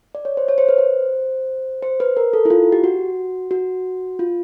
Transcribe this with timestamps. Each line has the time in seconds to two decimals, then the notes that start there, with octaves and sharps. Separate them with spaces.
0.15 D5
0.25 C#5
0.37 C5
0.48 C#5
0.58 C5
0.69 B4
0.78 C5
1.83 C5
2.00 B4
2.17 A#4
2.33 A4
2.45 E4
2.50 F4
2.72 G4
2.84 F#4
3.51 F#4
4.19 F4